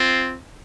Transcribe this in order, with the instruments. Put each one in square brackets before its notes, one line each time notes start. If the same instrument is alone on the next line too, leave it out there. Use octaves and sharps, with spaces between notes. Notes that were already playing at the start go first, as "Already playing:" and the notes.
Already playing: [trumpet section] C4 F4